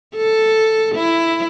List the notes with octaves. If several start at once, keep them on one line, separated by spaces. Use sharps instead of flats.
A4
E4